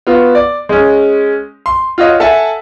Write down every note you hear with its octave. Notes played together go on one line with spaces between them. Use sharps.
B3 F4 F#4
D5
G#3 C#4
C6
F4 F#4 C#5 D#5
A4 E5 F#5 G#5 A5